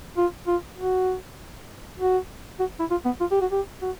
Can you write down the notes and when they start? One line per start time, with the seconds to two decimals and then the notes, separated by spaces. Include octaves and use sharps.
0.17 F4
0.47 F4
0.78 F#4
2.00 F#4
2.60 F#4
2.80 E4
2.91 F4
3.05 B3
3.20 F4
3.31 G4
3.41 F#4
3.52 G4
3.82 F#4